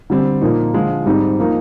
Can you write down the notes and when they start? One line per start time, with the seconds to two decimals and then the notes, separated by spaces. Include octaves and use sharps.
0.10 D3 G3 C4
0.42 A#2 F3 A#3 D#4
0.74 D3 F3 G#3
1.06 G#2 G3 C4 D#4
1.39 F3 A#3 D#4